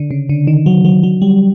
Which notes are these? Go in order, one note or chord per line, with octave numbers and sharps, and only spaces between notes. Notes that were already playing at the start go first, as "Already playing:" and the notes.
Already playing: D3
C#3
D3
D#3
F#3
F#3
F#3
G3